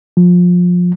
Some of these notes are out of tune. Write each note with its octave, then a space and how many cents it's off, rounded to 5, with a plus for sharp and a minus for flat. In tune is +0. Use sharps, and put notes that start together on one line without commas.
F3 +25